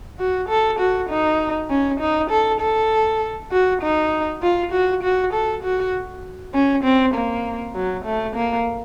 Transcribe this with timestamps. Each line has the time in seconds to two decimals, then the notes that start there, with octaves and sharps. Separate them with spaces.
0.19 F#4
0.49 A4
0.79 F#4
1.10 D#4
1.70 C#4
2.00 D#4
2.31 A4
2.61 A4
3.52 F#4
3.82 D#4
4.42 F4
4.72 F#4
5.03 F#4
5.33 A4
5.63 F#4
6.54 C#4
6.84 C4
7.14 A#3
7.75 F#3
8.05 A3
8.36 A#3